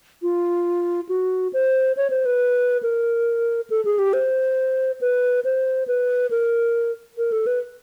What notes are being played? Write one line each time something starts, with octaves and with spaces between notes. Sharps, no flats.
F4
F#4
C5
C#5
C5
B4
A#4
A4
G#4
G4
C5
B4
C5
B4
A#4
A#4
A4
B4